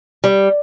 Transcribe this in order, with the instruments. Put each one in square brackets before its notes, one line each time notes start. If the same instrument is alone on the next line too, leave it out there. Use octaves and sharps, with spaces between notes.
[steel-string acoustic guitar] G3